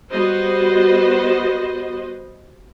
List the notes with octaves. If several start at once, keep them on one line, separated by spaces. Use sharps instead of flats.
G3 B3 F#4 B4 C5 D#5